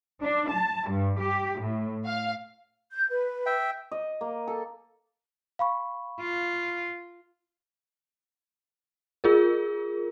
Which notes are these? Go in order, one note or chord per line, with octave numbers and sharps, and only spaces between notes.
D4
A5
G2
G4
A2
F5
G6
B4
E5 G5
D#5
A#3
A4
F5 B5 C#6
F4
F4 G#4 A#4